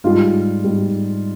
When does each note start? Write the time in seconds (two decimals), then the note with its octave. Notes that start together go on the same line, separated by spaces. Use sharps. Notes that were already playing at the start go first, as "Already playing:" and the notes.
0.04 G#2 G3 F4
0.64 G#2 G3